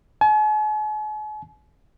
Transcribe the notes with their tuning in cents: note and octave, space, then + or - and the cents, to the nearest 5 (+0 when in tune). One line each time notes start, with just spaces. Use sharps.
G#5 +45